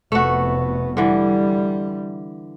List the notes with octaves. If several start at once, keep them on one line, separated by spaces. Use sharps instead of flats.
F1 A3 B3 F#4
D3 E3 G3